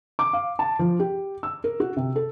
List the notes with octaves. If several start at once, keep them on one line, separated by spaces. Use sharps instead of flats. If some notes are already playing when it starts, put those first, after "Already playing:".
D6
F5
A5
F3
G4
E6
A#4
F#4
C3
A4